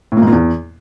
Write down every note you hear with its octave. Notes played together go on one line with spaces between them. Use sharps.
A2
A#2
G#2
A#2
E2